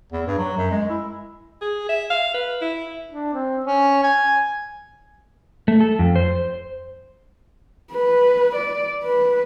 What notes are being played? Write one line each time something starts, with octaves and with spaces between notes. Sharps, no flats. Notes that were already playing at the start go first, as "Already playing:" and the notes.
E2
G2
F#3
F#2
G#3
E4
G#4
E5
F5
B4
E4
D4
C4
C#4
G#5
A3
A4
F2
C5
B4
D5
B4